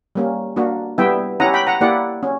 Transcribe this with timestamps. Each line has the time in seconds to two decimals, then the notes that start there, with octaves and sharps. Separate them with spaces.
0.15 G3 A#3 C#4
0.56 A#3 D4 F#4
0.98 G3 B3 E4 E5 G5
1.40 C#4 E4 G4 F#5 A#5
1.54 G5 B5
1.67 F#5 A#5
1.81 A#3 E4 G4 D5 F#5
2.23 C#4